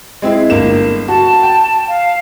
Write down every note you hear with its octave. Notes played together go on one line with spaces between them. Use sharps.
G#3 C4 E4
G1 A#3 E7
F#4 A5
G5
F5